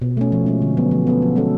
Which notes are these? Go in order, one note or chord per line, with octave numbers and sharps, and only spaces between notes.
B2
A3 C#4
F3
G#3 C#4
D3
F#3 B3
F3
B3 F4 A4
F3
G#3 C#4 F#4 A4